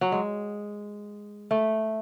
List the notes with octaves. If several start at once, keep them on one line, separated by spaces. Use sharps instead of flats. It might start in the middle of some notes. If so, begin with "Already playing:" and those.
F#3
G#3
A3